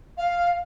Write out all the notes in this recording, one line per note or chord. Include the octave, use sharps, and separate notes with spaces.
F5